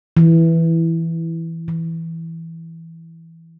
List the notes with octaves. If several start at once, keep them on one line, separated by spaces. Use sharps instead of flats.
E3
E3